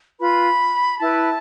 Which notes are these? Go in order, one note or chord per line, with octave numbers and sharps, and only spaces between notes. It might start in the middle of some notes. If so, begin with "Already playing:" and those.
F4 B4 B5
E4 B4 A5